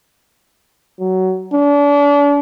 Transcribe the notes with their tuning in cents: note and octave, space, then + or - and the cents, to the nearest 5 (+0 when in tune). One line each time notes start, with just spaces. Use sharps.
F#3 +15
D4 -35